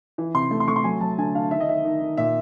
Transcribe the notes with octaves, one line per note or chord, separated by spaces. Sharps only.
E3
C3 C6
A3
C6
A3 C#6
C6
F#3 G#5
F#3 A5
D3 G#5
D3 F5
D#3 E5
D#5
D#3 E5
D#3
D#3
A#2 E5